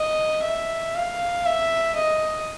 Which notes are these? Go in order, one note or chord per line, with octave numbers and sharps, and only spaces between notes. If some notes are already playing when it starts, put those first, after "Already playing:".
Already playing: D#5
E5
F5
E5
D#5